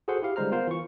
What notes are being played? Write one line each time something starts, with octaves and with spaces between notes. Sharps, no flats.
F#4 G#4 A4 C5 F#5 C6
E4 G4 F5
D3 G3 G#3 C5 A#5 F6
B3 F4 A#4 C5 F5
E3 C#6